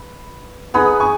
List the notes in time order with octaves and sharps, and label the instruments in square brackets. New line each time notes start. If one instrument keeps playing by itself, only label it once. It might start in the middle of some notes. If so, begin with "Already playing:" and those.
Already playing: [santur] B4
[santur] B3 D#4 G#4 B4 [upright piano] F#5 B5
[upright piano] G#5 C#6